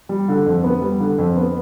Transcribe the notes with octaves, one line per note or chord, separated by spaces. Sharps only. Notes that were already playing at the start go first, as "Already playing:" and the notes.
G3
D3
F2
B3
G3
D3
F2
B3